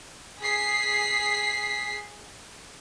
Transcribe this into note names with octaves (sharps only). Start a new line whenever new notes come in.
G#4 B6 C7